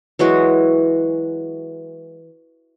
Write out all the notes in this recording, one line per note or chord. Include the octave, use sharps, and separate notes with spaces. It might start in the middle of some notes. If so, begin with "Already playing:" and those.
E3 F#3 G#3 F#4